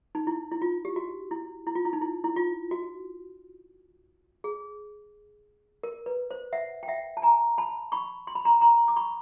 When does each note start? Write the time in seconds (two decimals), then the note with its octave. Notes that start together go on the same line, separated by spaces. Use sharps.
0.15 D#4
0.27 E4
0.51 E4
0.62 F4
0.85 G4
0.96 F#4
1.31 E4
1.67 E4
1.75 F4
1.85 E4
1.93 D#4
2.01 E4
2.24 E4
2.36 F4
2.71 F#4
4.44 G#4
5.83 A#4
6.06 B4
6.31 C5
6.53 E5 F#5
6.83 G5
6.88 E5 F#5
7.17 A5
7.22 G#5 A#5
7.58 A5 B5
7.92 B5 C#6
8.27 C6
8.35 B5
8.45 A#5 C6
8.61 A#5 C6
8.88 D6
8.96 B5 C#6